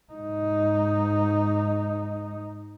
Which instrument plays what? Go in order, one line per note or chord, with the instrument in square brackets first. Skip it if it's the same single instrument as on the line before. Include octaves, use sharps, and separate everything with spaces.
[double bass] G#2 D#4